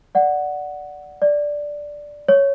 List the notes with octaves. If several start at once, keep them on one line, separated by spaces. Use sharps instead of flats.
D5 F#5
D5
C#5